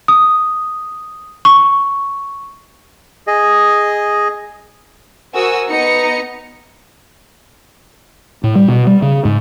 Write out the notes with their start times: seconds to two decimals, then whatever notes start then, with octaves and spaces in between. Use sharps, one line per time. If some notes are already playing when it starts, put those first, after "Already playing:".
0.08 D#6
1.45 C#6
3.27 G#4 D#5
5.34 F#4 A#4 C5 G#5 D#6 E6
5.69 B3 D#4 A#5 C#7
8.44 A2
8.55 G3
8.68 B2
8.87 G3
9.02 C#3
9.25 G#2